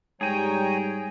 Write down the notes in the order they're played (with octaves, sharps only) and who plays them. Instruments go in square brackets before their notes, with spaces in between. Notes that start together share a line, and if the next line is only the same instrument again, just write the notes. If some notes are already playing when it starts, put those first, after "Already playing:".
[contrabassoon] G#2 [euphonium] G3 [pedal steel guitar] G#4 G#5 [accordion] C#5 G5 A#5